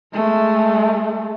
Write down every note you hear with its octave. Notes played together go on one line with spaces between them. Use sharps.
G#3 A3